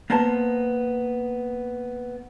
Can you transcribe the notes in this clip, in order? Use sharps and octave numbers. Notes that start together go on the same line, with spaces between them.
A#3 B3 C5 A5